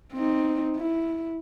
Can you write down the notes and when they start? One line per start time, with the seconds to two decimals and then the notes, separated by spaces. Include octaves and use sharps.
0.13 C4 D#4
0.77 E4